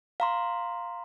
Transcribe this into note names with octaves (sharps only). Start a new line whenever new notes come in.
F5 A#5 C6